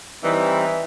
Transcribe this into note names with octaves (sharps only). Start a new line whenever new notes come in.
E3 G3 C4 D#4